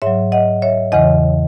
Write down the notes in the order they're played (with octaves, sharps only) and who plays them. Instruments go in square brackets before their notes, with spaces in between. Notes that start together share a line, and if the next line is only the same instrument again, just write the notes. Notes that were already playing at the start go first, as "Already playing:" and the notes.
[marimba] G#2 F#3 C#5 E5
D#5 F#5
C#5 E5
E2 C#3 E3 D#5 F#5